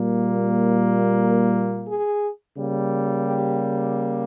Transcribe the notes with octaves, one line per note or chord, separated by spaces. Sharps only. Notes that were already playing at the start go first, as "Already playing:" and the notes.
Already playing: A#2 G3 A#3
A#4
G#4
C#3 G3 A#3
G4